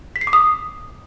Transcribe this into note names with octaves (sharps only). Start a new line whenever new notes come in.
B6
C7
D6
D#6